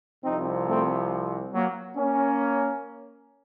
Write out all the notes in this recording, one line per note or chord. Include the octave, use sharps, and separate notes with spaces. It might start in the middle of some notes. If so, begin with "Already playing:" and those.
C2 C3 F3 C4 D#4
A3 C4
F#3 A#3
A#3 C#4